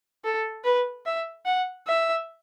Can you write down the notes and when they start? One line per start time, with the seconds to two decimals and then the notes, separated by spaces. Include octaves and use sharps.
0.24 A4
0.64 B4
1.06 E5
1.46 F#5
1.87 E5